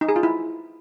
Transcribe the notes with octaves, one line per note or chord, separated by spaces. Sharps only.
D#4
G#4
F4
E4